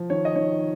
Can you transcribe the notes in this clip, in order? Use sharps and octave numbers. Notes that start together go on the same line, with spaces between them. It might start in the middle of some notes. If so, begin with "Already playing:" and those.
Already playing: F3
D#3 C#5
D#5
D#3 C#5